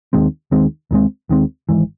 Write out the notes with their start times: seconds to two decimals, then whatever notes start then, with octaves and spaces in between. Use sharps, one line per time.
0.13 D#2 D#3 G#3 C4
0.51 D#2 D#3 G#3 C4
0.91 D#2 D#3 G#3 C4
1.29 D#2 D#3 G#3 C4
1.69 G#1 G#2 E3